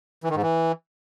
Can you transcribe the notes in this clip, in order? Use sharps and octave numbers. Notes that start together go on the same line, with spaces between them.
E3
D#3
G#2
E3